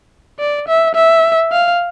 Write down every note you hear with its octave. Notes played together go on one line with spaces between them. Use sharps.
D5
E5
E5
F5